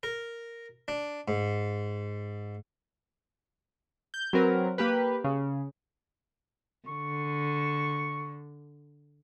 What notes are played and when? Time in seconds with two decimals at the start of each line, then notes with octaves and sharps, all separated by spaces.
0.03 A#4
0.88 D4
1.28 G#2
4.14 G6
4.33 F#3 C4 A#4 B4
4.78 A#3 G4 B4
5.24 C#3
6.88 D3 C#6